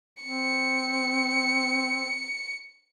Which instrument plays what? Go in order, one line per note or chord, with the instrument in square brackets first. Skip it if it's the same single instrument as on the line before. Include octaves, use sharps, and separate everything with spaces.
[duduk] C4 [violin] C#7